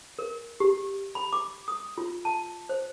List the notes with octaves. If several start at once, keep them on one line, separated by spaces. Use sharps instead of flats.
A#4
G4
B5
D6
D#6
F4
A5
C5